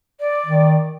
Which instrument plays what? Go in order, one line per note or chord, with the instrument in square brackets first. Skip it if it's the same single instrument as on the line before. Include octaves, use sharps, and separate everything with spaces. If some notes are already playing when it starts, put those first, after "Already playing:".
[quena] D5
[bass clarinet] D#3